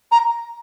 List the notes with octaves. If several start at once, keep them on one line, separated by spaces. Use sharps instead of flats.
A#5